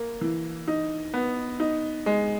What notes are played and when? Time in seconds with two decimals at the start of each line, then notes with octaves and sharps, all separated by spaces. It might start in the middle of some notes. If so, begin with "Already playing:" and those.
Already playing: A#3
0.21 E3
0.68 D#4
1.14 B3
1.60 D#4
2.06 G#3